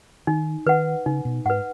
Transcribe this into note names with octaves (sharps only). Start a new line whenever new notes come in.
D#3 D#4
D#3 B4 F#5
C#3 D#4
B2
G#2 B4 F#5